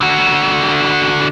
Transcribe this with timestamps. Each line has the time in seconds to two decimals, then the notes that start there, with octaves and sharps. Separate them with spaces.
0.01 D3 F#4